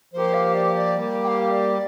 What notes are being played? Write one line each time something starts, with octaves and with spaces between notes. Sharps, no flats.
F3 A#3 G4 C5
F5
D5
D5
G3 A#3 G4
G5
F5
D5